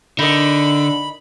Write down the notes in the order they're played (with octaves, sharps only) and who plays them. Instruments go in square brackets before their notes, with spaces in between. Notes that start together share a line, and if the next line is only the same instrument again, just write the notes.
[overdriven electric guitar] D3 [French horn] D4 [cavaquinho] D#4 A#4 D#5 [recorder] B5